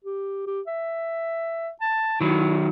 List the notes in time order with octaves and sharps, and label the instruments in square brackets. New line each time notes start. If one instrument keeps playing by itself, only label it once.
[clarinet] G4
G4
E5
A5
[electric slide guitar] D#3 F#3 [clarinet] E4